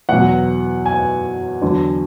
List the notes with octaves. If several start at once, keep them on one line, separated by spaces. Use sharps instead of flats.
E2 B2 F#3 F#5
G#5
E2 D3 F#3